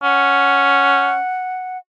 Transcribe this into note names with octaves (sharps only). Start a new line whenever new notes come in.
C#4 F#5